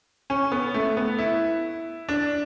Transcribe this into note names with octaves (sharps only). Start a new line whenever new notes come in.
C#4
B3
A3
B3
E4
D4